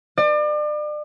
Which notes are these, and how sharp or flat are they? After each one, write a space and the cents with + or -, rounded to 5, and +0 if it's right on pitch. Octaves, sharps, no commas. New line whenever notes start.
D5 +35